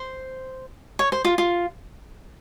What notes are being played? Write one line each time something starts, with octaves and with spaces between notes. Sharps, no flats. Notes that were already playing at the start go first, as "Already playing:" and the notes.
Already playing: C5
C#5
C5
F4
F4